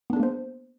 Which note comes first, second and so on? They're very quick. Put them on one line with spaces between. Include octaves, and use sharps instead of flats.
B3 D4 G#4 A#3 C5